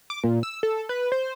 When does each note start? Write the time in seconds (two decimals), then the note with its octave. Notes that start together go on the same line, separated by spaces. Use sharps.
0.10 D6
0.24 A#2
0.43 E6
0.63 A4
0.89 B4
1.12 C5